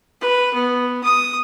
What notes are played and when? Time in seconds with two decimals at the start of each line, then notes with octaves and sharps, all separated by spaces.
0.21 B4
0.54 B3
1.04 D#6